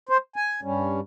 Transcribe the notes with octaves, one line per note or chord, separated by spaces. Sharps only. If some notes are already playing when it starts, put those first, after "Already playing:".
C5
G#5
G2 G3 C#4